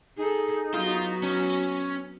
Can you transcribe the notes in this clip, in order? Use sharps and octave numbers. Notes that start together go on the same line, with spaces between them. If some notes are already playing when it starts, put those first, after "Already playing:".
D#4 G#4 A4
F#3 B3 F4 F#4
C#4